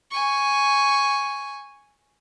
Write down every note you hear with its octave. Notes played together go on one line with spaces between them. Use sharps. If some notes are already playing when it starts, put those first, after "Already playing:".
G#5 C#6